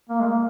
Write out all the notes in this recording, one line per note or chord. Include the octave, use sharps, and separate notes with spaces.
A#3
G#3
A#3